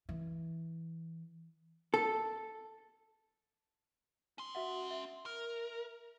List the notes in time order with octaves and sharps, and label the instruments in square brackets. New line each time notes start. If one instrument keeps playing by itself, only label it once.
[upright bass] E3
[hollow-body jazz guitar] A4
[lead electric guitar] C#4 C6
[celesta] F#4 E5 F#5
E5
[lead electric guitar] A#4